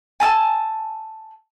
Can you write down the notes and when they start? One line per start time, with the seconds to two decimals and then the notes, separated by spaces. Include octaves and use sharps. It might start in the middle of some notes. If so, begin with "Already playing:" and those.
0.20 G#5 A5 E6